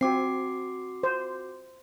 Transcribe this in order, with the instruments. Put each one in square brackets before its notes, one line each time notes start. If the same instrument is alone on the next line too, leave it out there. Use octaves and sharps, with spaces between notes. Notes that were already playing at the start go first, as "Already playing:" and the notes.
[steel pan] C4 [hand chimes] F#4 D6 C7
[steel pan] C5